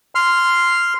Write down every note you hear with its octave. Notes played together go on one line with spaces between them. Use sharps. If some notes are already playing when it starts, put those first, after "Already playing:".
C6 F6